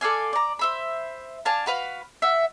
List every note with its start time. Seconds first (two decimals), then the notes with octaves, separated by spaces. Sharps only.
0.01 A4 D5 F5 G#5
0.33 D5 A#5
0.59 C5 E5 B5
1.45 D4 F5 G#5 A5
1.66 F#4 B4 F5
2.22 E5 F#5